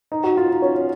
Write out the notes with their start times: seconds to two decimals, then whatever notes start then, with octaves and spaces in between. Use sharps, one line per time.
0.12 D#4
0.23 F#4
0.37 F4
0.50 D#4
0.62 C#4
0.75 C#4